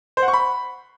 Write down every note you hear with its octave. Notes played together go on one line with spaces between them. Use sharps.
C5
F#5
C#6
B5